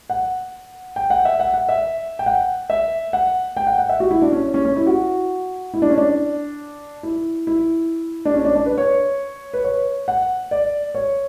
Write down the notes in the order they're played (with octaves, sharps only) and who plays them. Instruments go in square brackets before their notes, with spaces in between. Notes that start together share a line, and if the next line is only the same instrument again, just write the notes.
[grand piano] F#5
G5
F#5
E5
F#5
F#5
E5
G5
F#5
E5
F#5
G5
F#5
F#5
E5
F#4
E4
D4
C#4
C#4
C#4
E4
F#4
E4
D4
C#4
D4
E4
E4
D4
C#4
D4
D4
B4
C#5
B4
C#5
F#5
D5
C#5